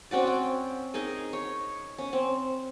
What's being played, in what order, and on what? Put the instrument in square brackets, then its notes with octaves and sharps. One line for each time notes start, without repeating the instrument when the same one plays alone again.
[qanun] C4 C#4 F#4 D5
G5
D#4 G#4 A#4 D#5
C#5
C#4
C4